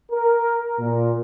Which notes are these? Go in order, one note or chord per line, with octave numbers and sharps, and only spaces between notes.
A#4
A#2